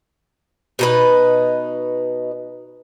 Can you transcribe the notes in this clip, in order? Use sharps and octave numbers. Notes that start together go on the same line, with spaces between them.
B2 D#4 B4